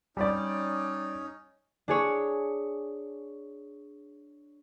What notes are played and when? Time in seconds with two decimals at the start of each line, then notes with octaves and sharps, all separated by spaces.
0.17 G3 C#4 D#4 D5
1.88 D4 G#4 C#5